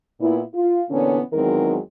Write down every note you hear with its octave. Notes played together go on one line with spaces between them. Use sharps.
A#2 B3 E4
F4
A#2 D3 E3 B3 C#4
E2 D#3 F#3 G#3 C4 A#4